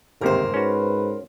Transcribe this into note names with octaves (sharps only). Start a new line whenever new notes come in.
G1 D#2 G#2 C3 A#4 C5
G#2 C#4 F#4 B4